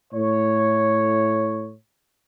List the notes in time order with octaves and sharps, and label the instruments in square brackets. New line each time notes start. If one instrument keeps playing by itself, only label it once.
[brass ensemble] A2 C#5